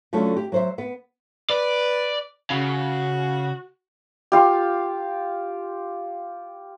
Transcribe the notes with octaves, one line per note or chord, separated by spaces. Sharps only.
D3 F#3 A3 C#4 F4 A4
G4
F#3 C5 E5
B3
B4 D5
C#3 F#4
F4 G4